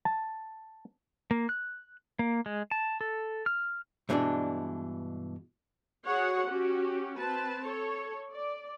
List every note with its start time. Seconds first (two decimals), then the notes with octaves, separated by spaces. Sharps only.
0.05 A5
1.31 A#3
1.49 F#6
2.19 A#3
2.46 G#3
2.71 A5
3.01 A4
3.46 F6
4.09 G2 B2 E3 G#3 B3 D4
6.05 F#4 G#4 C#5 F#5
6.47 C#4 F#4 G4
7.19 C4 B4 A5
7.65 A4 C#5
8.31 D5